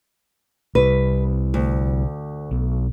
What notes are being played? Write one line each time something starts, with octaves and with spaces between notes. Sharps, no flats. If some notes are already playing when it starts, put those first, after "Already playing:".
C2 C3 B4
D2
B1